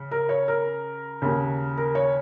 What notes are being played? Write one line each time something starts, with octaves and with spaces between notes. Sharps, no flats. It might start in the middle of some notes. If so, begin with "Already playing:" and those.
Already playing: C#3
A#4
C#5
A#4
D#2 C#3
A#4
C#5